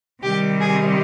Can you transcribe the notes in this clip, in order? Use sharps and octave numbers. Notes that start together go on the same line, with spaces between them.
C3 D#3 G3 G4
G#4